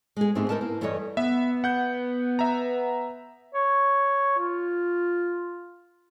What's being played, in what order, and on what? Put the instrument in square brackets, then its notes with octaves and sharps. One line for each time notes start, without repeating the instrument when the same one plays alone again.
[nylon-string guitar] G#3 G#4
G#2 A3 C4 D#4 G4
D#4 E4 A#4 B4 A5
A#3
G2 E3 G3 A4 C#5 D#5
[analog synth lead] B3 [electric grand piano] E5
[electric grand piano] F#5 G6
E5 A#5
[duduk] C#5
F4